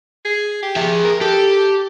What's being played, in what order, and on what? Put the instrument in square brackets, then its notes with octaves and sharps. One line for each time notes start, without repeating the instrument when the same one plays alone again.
[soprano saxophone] G#4
G4
[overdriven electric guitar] G#4 E5
[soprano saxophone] A#4
[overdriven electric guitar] G4 [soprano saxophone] A4